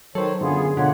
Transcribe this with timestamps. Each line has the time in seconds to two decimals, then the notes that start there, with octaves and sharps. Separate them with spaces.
0.15 D#3 F#3 A4 C5 C#5
0.41 F#2 D3 B3 F4 G#4
0.77 B2 D3 G#3 A#3 F4 C#5 F#5